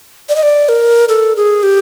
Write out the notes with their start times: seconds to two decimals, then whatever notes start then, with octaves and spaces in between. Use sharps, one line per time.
0.29 D5
0.36 D#5
0.43 D5
0.69 A#4
1.09 A4
1.37 G#4
1.63 G4